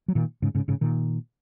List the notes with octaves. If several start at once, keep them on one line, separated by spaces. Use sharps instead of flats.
F#3
A#2 D#3
G#2 C#3
G#2 C#3
G#2 C#3
A#2 D#3